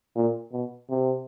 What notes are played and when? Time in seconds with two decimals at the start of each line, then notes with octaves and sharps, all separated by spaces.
0.16 A#2
0.53 B2
0.90 C3